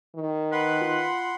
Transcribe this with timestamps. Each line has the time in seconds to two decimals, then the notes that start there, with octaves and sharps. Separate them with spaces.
0.15 D#3
0.52 B4 F#5 B5 C6
0.82 F4